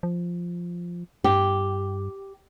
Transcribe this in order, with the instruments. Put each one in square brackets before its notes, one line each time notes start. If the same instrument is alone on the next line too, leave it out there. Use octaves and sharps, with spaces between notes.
[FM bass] F3
[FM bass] G2 [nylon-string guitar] G4